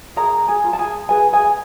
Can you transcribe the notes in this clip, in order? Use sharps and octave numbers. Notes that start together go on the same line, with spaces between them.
G#4 A#4 A#5
G#4 G#5
F4
A5
G#4 G#5
G#4 B4 G#5
G#4 G#5